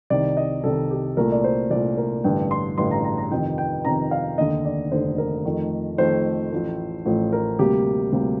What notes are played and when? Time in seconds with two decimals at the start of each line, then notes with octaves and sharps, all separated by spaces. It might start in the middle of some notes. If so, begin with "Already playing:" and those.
0.10 C2 C3 D#3 D5
0.37 D#5
0.64 C2 C3 D#3 A4
0.91 G4
1.17 C2 A#2 A3 A#4
1.32 D5
1.44 C5
1.70 C2 A#2 A3 D5
1.97 A#4
2.24 A1 G2 D3 G5
2.51 C6
2.78 A1 G2 D3 C6
2.91 A#5
3.04 A#5
3.18 A#5
3.31 F2 C3 D#3 G5
3.58 G5
3.85 F2 C3 D#3 A#5
4.11 F5
4.38 F1 D#2 D3 D#5
4.65 D5
4.92 F1 D#2 D3 C5
5.18 A#4
5.45 F2 D#3 A3
5.98 F2 D#3 A3 C5
6.52 A1 A2 F3 A3
7.05 A1 A2 F3 A3
7.33 A#4
7.59 D2 C3 G3 A#3 G4
8.12 D2 C3 G3 A#3